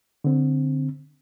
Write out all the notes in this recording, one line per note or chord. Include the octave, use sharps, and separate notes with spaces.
D3 C4